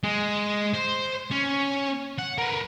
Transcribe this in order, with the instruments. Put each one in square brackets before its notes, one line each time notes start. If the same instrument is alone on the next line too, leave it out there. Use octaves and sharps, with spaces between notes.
[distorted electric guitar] G#3
C5
C#4
F#5
A#4 B4